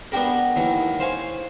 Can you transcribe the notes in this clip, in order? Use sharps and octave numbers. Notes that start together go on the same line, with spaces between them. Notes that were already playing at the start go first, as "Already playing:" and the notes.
B3 D4 F#4 G4 A#4
D#2 E3 F#3
C5 F5 G#5 C#6